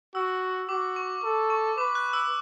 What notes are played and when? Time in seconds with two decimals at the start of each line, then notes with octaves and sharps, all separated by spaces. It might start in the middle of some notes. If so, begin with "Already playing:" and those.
0.15 F#4 E6
0.69 F#4 D6
0.96 C#6
1.23 A4
1.50 C#6
1.78 B4 D6
1.95 F#6
2.13 E6